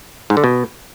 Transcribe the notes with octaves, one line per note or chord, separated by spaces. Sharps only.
G#2
D3
B2